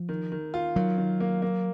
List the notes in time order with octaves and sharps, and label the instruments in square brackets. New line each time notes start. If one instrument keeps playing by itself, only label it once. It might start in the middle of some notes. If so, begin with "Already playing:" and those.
Already playing: [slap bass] F3
[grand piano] D#3
D#3
F4
[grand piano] D#3 [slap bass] F#3
[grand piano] D#3
A#3
A#3